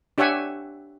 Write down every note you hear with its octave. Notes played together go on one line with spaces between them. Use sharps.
D4 G4 C#5 E5 F#5 G#5